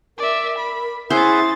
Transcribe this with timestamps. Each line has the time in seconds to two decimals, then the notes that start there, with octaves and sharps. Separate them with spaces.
0.18 A#4 D5 E5
0.58 B5
1.10 C#4 E4 G#4 C5 E5 F#5 A6